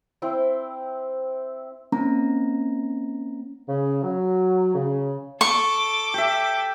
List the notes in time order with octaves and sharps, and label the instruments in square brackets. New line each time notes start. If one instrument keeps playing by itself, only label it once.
[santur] C4 E4 C5 G5
[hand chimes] A#3 C4 C#4 A#5
[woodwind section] C#3
F#3
C#3
[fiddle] A4 D6 [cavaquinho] C#6
[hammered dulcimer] G4 E5